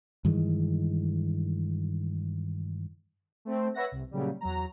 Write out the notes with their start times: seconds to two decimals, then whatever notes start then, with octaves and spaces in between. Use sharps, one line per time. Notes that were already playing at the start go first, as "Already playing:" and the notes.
0.25 G2 D#3 E3 G#3
3.45 A3 C4
3.74 B4 C#5 E5 F#5 A#6
3.92 C2
4.11 A#2 C#3 F#3 G3
4.41 E2 F#3 A#5